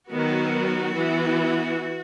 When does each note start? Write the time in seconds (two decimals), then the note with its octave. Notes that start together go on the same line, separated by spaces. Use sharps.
0.11 D#3 F#3 B3 F#4
0.95 E3 B3